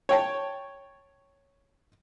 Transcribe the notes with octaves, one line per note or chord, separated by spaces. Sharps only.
C#5 G5 A5